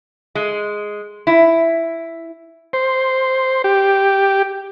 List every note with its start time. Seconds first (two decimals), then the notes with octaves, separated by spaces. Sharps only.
0.35 G#3
1.27 E4
2.73 C5
3.64 G4